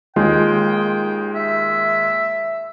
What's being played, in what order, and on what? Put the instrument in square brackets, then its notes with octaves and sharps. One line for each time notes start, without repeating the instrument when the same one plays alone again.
[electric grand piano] D#2 G#3 F4 [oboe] G5
[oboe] E5